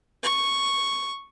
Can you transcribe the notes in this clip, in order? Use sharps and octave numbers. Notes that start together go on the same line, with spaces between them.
C#6